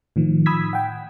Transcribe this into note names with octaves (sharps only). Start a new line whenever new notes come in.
A2 D#3 F3
B5 D#6 E6 G#6 B6
F#5 G5